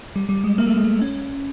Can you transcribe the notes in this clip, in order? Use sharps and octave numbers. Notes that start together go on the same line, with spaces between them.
G3
G3
G#3
A#3
A3
G#3
A3
C#4